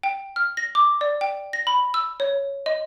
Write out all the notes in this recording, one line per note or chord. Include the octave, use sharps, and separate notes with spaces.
G5
F6
A#6
D6
D5
G5
A#6
B5
E6
C#5
D#5